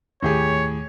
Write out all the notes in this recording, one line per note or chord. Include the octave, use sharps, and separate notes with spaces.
D#2 A2 D#3 G4 G#4 C#5